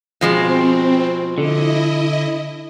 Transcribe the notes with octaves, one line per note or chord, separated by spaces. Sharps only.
B2 F3 G#3 C4
D3 E4 D#5